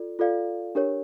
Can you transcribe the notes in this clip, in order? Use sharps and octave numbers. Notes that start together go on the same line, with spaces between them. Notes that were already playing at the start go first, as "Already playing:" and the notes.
Already playing: F4 A4 D5
F4 A4 D5 F5
D4 G4 A#4 C#5